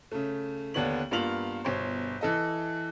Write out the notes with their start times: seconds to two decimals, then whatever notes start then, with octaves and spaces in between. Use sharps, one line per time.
0.11 C#3 A3
0.74 D#2 D3 B3 D4 C#5 F#7
1.11 G2 A#3 B3 F4 F7 F#7
1.64 G1 B2 C5 C#5
2.21 E3 A4 D#5